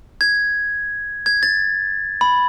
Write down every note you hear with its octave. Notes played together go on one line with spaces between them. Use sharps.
G#6
G#6
A6
B5